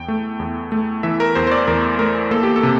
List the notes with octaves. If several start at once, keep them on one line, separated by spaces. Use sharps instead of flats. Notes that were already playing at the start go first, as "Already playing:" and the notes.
Already playing: E2 G5
A3
E2
A3
E3 E5
A#4
E2 C5
C5
D5
E2 A#4
A3 A#4
A#3 A4
G4
A4
C3